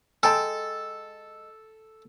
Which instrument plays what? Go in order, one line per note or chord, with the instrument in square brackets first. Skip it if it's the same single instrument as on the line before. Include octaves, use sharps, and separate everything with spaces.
[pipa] G#3 G5 A5 [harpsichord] A4